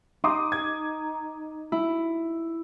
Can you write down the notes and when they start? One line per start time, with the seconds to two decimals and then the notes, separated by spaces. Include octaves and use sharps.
0.24 D#4 C6 D6 D#6
0.52 G#6
1.72 E4